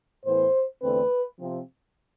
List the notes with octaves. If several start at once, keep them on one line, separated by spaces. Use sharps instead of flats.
A2 E3 B3 C5
E2 D3 A3 C4 B4
C3 F3 C4